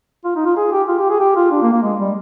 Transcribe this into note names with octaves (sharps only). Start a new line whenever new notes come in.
F4
D#4
F4
G#4
G4
F4
G4
G#4
G4
F4
D4
A#3
A#3
G#3
G3